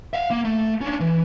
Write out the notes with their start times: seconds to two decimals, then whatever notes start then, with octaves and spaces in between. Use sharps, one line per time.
0.13 E5 F5
0.30 A#3
0.45 A3
0.81 C#4 D4
1.00 E3